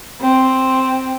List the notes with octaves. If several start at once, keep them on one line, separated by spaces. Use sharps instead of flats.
C4